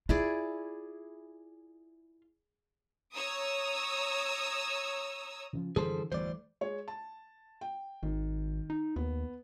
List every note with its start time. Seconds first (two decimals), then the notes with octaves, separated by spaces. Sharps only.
0.09 E4 F4 G#4 D5
3.14 C#5 A#5 D#6 E6
5.53 C#3 E3 F3
5.76 F#2 D3 E3 F3 G3 G#4 A4 C5
6.12 G1 E2 E3 F#3 G3 A3 C5 D5
6.61 G#3 C#5
6.88 A5
7.61 G5
8.03 G#1 D#3
8.70 D#4
8.96 D#2 B3